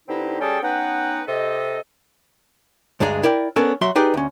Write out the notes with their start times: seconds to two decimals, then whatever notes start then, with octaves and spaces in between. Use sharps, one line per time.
0.07 D3 C4 D#4 E4 G4 B4
0.40 G3 C#4 G#4 A4 G5 A5
0.62 B3 C#4 D#4 B4 F#5 G5
1.27 C3 A4 D#5
3.00 D2 G2 G#3 D4 G#4 A#5
3.23 E4 A#4 D5 G5
3.56 B3 C#4 D4 A4 A#4
3.81 F#3 F#4 E5 C6
3.95 D#4 G4 G#4 B4 D5
4.14 D2 C#4